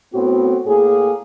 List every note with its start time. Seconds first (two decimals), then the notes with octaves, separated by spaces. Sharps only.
0.13 A2 B3 C4 F#4
0.66 A2 A#3 G#4